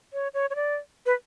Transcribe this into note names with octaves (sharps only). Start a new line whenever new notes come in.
C#5
C#5
C#5
D5
B4